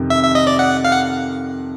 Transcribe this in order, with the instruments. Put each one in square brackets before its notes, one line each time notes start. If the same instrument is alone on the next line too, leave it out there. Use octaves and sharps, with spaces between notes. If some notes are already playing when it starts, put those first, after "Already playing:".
Already playing: [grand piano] F2 C3 D#3
[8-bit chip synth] E5
E5
D#5
D5
F#5
F5
F#5